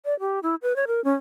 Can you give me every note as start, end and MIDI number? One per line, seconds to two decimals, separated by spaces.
0.05 0.18 74
0.20 0.40 67
0.43 0.55 64
0.62 0.76 71
0.76 0.85 73
0.87 1.03 70
1.04 1.13 61